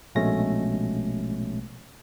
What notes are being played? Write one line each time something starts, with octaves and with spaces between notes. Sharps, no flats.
A#1 B2 G#3 A3 C#4 A#6